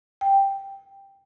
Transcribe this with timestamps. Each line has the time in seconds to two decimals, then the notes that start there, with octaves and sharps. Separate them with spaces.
0.21 G5